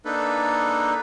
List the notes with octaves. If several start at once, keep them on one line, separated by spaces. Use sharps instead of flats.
A#3 D4 D#4 A4 B4